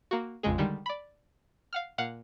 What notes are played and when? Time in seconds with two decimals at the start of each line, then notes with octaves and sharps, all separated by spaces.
0.11 A#3 F#4
0.43 A#1 F2 C#3 G#3 G#4
0.58 D3 D#3 G3 G#3
0.86 D5 B5
1.73 F5 F#5 F6
1.98 A#2 F5 F#5